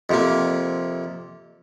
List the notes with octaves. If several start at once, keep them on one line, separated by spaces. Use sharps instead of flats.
F2 C3 A#3